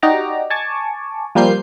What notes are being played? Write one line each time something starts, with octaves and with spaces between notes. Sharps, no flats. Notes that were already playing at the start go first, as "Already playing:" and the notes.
D#4 F#4 G4 D5 A#5 D6
G#5 A5 C#6 D6
F3 G3 A#3 C5 G6 C7